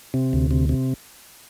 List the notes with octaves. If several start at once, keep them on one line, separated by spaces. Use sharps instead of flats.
C3
D2
C3
C3